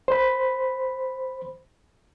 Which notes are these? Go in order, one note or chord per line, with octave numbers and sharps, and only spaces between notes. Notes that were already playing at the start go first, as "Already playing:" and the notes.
C5 B5